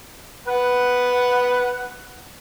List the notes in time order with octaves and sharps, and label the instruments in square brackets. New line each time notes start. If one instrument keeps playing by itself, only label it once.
[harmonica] B4 F#5